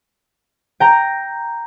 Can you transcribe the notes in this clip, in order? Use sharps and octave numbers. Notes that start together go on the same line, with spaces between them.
G5 A#5